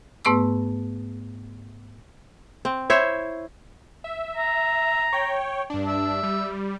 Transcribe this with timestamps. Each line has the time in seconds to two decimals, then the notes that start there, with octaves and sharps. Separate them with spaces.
0.25 G#2 A3 B3 B4 C#6 E6
2.65 C4
2.90 E4 C5 C#5 E5
4.04 E5
4.37 A#5
5.13 C#5 G5
5.70 G2 D4
5.87 E5
6.23 G3